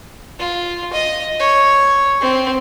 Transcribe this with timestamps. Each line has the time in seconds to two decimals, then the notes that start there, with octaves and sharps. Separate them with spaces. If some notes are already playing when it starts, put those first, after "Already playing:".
0.40 F4
0.93 D#5
1.40 C#5
2.21 C4